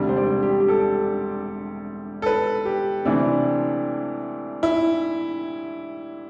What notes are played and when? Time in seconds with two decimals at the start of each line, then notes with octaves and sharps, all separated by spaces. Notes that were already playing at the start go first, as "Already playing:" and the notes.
Already playing: E1 D2 C3 G3
0.09 C5
0.16 D5
0.43 G4
0.60 G4
0.68 A4
2.22 A4
2.26 B4
2.65 G4
3.05 D2 C3 E3 A3 C4 D4
4.63 E4